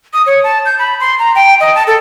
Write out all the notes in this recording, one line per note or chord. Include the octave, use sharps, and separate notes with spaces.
D#6
C#5
A5
G6
B5
C6
A#5
G5
D#5
A5
A4